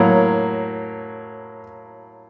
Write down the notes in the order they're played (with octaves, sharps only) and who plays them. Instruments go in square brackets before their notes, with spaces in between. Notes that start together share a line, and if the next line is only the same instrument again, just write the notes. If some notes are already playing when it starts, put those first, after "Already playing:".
Already playing: [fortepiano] A2 F#3 A#3